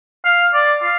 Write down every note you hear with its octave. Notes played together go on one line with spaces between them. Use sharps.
F5
D5
F5